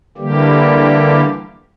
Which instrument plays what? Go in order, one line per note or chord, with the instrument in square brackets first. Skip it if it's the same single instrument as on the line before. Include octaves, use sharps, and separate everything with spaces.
[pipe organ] D3 E3 G3 A#3 G4